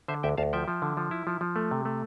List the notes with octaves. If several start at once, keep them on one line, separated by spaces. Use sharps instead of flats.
D3 C5 E5
D2 E5 G5
D2 F5 A5
F3 E5 G5
F3
D3
F3
E4
F3
F3
A3
C3
A3